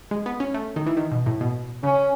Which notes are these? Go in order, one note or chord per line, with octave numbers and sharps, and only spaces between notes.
G#3
B3
C#4
A3
D#3
E3
D#3
B2
A2
B2
C#3 C#4